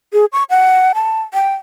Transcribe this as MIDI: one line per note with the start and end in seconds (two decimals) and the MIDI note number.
0.13 0.25 68
0.33 0.44 85
0.50 0.93 78
0.95 1.21 81
1.34 1.54 79